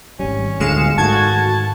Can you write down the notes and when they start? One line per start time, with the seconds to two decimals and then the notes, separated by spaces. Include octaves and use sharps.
0.19 G#1 G3 C#4
0.60 G1 D2 A2 G#3 G#4 F5 C#7 E7
0.98 G#2 D#3 A3 F#4 A5 G#6